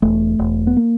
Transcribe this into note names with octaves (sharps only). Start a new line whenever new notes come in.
E1 A3
E1
B3
A#3